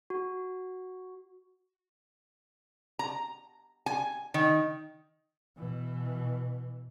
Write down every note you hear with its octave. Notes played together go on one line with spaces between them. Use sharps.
F#4
A#5
G#5
D#3
B2 E3